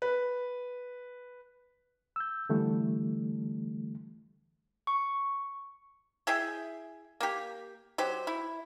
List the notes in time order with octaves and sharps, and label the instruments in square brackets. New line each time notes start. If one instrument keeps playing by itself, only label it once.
[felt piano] B4
[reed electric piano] E6 G6
D3 E3 G3 A3
[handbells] C#6
[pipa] E4 G#4 E5 G5
A#3 G4
F#3 G4 C5
E4